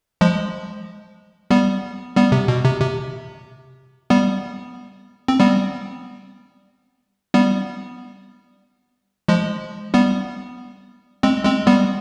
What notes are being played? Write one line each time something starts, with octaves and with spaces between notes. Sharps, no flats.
F3 G#3
G3 B3
G3 B3
C3
B2
C3
C3
G3 B3
C4
G3 B3
G3 B3
F3 G#3
G3 B3
G#3 C4
G#3 C4
G3 B3